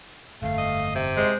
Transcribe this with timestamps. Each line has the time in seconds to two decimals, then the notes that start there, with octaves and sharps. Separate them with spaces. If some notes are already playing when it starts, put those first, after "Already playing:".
0.42 G1 F2 A3 F5
0.58 D#5
0.95 C3
1.17 G#3 C5